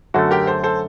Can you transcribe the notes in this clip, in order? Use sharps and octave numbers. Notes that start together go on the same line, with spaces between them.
F#2 D3 A3 F#4 A4
G4 A#4
A4 C5
A4 C5